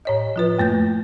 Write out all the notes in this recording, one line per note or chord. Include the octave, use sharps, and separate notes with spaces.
A2 C#5 D#5
F3 F4 B4
F#2 A3 A#3 G6